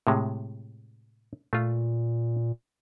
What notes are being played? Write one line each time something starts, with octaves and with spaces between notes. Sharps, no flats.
A2 C3 G#3
A#2 A3 F4